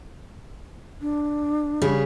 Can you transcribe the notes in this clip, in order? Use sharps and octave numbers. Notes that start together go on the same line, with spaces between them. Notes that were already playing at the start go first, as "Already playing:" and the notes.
D4
C#3 G3 G#4